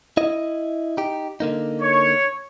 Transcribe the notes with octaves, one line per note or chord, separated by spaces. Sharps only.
E4 D#5
D#4 G4
D3 A#3 D#4
C#5